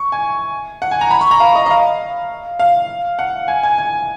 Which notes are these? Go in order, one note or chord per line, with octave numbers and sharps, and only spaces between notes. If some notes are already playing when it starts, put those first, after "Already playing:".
Already playing: C#6
G#5
F#5
G#5
A#5
B5
C#6
A#5
F5
D#5
D#5
F5
F5
F#5
G#5
G#5
G#5